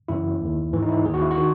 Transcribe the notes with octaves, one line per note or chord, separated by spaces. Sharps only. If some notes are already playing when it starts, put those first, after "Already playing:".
F#2 C#3 E3 E4
D#2 D#3
G#2 E3
D#4
E4
D#2 D#3 G#4
F#4
E4
F#4
D#3